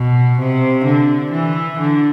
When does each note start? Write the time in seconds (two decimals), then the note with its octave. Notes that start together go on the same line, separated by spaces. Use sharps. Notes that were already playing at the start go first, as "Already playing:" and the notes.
Already playing: B2
0.38 C3
0.85 D3
1.31 E3
1.79 D3